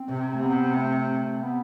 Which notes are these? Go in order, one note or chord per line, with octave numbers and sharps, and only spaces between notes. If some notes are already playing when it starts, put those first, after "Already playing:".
Already playing: C4
C3
A3
B3
A3
B3